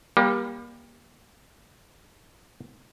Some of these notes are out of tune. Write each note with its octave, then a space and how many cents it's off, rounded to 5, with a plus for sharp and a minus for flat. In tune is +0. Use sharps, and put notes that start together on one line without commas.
G3 +20 A#3 +30